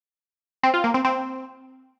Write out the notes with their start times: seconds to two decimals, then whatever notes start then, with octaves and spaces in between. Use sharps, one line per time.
0.63 C4
0.74 F4
0.84 A#3
0.94 C4
1.05 C4